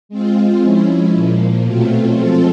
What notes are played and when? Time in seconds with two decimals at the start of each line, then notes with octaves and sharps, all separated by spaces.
0.09 G#3 C4 F4
0.61 F3 G#3 C#4 E4
1.13 A#2 F3 A#3
1.65 B2 F#3 A3 C4 F4
2.17 F3 G#3 C4 F4 A4